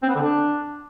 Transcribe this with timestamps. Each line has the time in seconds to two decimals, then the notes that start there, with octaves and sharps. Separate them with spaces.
0.03 C4
0.09 B3
0.15 D3
0.22 D4